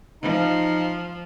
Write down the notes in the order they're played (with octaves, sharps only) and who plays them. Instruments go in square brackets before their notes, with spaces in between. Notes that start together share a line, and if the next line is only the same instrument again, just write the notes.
[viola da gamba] F3 [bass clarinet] D#4